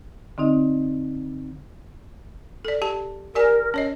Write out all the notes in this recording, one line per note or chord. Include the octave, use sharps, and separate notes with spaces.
D3 C4 D#4 D#5
A4 D5
G4 A5
G4 A#4 D5 G#5
C#4 C#5 D#5